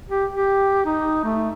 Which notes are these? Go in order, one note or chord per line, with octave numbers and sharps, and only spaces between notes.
G4
G4
D#4
A3